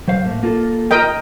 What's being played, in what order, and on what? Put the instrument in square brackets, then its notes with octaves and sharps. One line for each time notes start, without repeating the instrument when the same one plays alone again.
[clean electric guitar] F#3 C5 F5
A2 A3 A#3
A#3 F4 A4
[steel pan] A#4 D#5 G5